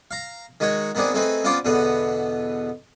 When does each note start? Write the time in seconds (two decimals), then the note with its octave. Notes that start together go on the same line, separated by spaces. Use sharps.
0.11 F5 A#5
0.60 D#3 G#3 D#4 F#4 C#5
0.95 D#3 B3 C4 D4 G#4
1.14 A3 C4 D#4 G#4 B4 B5
1.44 B3 C#4 F4 C5 D5
1.65 E2 B2 D3 B3